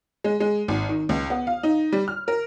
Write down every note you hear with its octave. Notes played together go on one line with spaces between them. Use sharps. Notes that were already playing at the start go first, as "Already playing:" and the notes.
G#3
G#3
G#1
D#3
C#2
B3
F5
D#4
G3
F6
A#4